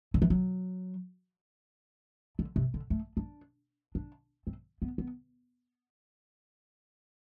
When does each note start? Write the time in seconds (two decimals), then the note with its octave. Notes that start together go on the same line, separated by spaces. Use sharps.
0.14 D3
0.22 E3
0.30 F#3
2.39 D3
2.56 C3
2.74 D3
2.90 A3
3.17 D4
3.95 D4
4.47 C4
4.82 B3
4.98 B3